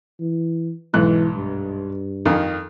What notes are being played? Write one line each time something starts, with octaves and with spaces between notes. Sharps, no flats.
E3
B1 G#2 E3 F#6
G2
F2 D#3